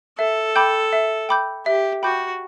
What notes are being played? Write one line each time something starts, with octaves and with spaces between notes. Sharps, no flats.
A4 E5
G5 B5 D6 G6
E5
G5 B5 D6 G6
G4 E5
F#4 G5 B5 D6 G6